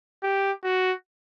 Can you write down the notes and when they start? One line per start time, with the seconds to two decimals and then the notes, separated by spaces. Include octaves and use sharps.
0.23 G4
0.64 F#4